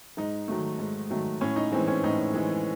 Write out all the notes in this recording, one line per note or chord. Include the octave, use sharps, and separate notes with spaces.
G#2 D#4
D#3 F#3 A3
G#2
D#3 F#3 A3
A2 C#4
D#4
E3 G#3 C4
C#4
A2 D#4
E3 G#3